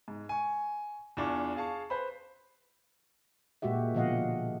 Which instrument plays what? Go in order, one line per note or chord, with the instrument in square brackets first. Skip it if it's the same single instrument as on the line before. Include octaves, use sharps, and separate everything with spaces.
[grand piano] G#2
G#5 C#6
E2 E3 D4 F4 C#6
G#4 F5 A5 C#6
B4 C5 B5
[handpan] A#2 G#3 F#4 G4 E5
B2 D3 F3 D#5 F5 F#5